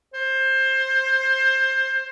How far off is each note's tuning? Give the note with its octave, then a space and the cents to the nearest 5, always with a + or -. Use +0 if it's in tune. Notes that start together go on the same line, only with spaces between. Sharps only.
C5 +20